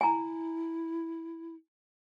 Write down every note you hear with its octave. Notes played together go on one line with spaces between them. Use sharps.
E4 G#5 A#5